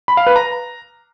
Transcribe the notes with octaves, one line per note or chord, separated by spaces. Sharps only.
B5
F5
B4
A#5